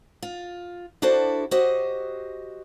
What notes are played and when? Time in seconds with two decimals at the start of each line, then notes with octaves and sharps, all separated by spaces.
0.22 F4
1.02 D4 E4 F#4 A4 C5 D5
1.51 F#4 G4 C5 D#5